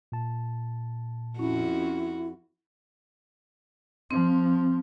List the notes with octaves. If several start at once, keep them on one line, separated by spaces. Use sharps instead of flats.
A#2 A5
F2 C#4 E4 F#4
F3 C4